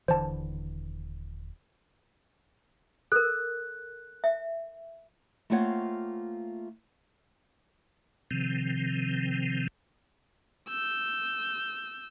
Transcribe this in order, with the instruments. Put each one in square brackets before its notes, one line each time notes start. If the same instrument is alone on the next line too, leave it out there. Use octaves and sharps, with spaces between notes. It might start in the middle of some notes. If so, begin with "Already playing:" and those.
[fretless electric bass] D#1 D3 E3 [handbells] C5 A5
[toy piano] A4 A#4 [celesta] F#6
[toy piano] E5
[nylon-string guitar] A3 A#3 C4 F4 C#5 F#5
[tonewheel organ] C3 D#3 F3 C4
[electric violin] E6 G6